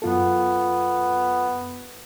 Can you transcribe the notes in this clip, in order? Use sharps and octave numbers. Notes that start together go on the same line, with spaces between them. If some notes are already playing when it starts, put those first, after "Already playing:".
F#2 B3 F4 A4